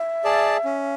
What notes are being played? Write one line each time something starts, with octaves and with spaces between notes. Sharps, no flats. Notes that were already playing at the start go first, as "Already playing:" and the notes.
Already playing: E5
G#4 D5 A5
C#4